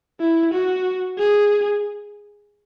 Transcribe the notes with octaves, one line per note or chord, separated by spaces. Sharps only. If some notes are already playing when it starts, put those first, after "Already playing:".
E4
F#4
G#4